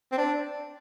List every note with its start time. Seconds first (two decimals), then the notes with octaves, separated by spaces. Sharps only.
0.12 C4
0.18 D4